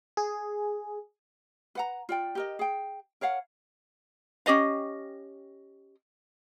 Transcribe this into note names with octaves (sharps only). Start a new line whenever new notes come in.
G#4
B4 F#5 A#5
F4 D5 G5
G4 A#4 D#5
G#4 G5
A#4 C#5 F5 F#5
C#4 G4 D#5 F5